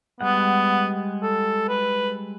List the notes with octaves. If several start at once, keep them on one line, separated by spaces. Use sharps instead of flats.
G3 G#3 B3 F#5
A4
B4